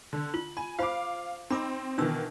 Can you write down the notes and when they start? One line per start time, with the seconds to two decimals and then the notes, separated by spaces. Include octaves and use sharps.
0.13 D3
0.34 F4 F#7
0.57 G#5 B5
0.79 F4 C5 F5 B5 D6
1.50 C4 D#4 B5 D6 E6
1.98 B2 D#3 E3 D4 E6